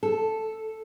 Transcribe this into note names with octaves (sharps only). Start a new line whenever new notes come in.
A4